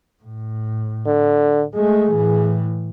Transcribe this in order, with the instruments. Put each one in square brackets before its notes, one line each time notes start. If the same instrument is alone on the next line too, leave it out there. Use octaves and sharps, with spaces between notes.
[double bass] A2
[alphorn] D3
[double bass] G#3 A3 [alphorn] G#4
[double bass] A2 E3